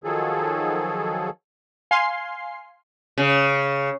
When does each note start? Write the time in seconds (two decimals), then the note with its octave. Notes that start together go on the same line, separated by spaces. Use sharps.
0.04 D#3 F3 F#3 G#4 A4
1.91 F5 G#5 C6 C7
3.18 C#3